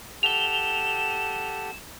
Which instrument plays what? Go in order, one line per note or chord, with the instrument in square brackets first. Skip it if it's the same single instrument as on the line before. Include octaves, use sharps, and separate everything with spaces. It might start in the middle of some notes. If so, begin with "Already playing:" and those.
[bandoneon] G4 A4 F#5 [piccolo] E7 [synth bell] F7 G7